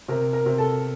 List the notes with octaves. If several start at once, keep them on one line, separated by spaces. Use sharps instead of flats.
C3 A#4
A#4
C3
A4